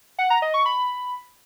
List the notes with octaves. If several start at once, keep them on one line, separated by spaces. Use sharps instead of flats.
F#5
A#5
D#5
C#6
B5